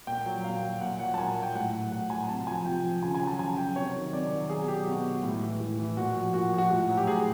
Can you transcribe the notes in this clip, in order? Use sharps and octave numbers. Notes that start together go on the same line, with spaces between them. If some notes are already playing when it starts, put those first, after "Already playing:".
A#2 G5
F#3
A#2 F5
F#3
A#2 F#5
F#3 F#5
A5
A#2 G#5
F#3
G5
A2 F#5
F#3
A2 F#5
F#3 G#5
C3 A5
F3 G#5
C3 G5
F3
C#3 G#5
G#5
F#3
A5
C#3 G#5
F#3 G5
C3 C#5
D#3 F#3
C3 D5
D#3 F#3
B2 G#4
F#3 G4
B2 F#4
F#3
A2
E3
A2
E3
A#2 F#4
F3
A#2 F#4
F3
F#4
A2 F#4
F#3
G4
A2 G#4